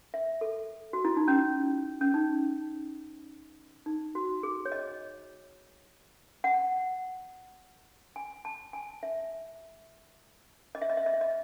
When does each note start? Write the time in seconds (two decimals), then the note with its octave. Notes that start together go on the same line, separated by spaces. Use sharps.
0.14 E5
0.41 A4
0.93 F#4
1.05 E4
1.17 D#4
1.28 C#4
2.01 C#4
2.14 D#4
3.86 D#4
4.15 F#4
4.43 G#4
4.65 C#5
4.72 D#5
6.44 F#5
8.16 G#5
8.45 A5
8.73 G#5
9.03 E5
10.75 D#5
10.82 E5
10.90 D#5
10.97 E5
11.06 D#5
11.14 E5
11.21 D#5